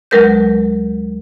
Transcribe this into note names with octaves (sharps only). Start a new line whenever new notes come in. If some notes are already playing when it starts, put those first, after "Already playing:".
D2 F#3 G#3 A#4 B4 G6